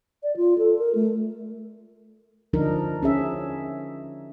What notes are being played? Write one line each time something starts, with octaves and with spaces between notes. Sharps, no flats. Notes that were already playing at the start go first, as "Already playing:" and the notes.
D5
F4
A4
A#4
A3
D3 F3 D4 D#4 A#4
C#4 G#4 E5